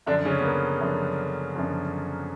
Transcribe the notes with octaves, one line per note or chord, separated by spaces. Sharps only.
F#2 D3 F3 D4
C#3 C#4
B3
A#3
F#2 D3 F3
F#2 D3 F3